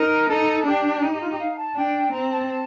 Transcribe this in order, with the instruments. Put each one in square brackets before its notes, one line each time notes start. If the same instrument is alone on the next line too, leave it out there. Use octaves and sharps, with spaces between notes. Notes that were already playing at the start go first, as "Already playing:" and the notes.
Already playing: [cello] D#4 [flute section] A#4
[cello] D#4 [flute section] A4
[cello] D4 [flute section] G4
[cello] D#4 [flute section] G4
[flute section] G4
F4
G4
F5
A5
[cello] D4 [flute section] G5
[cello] C4 [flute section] A#5
[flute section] A5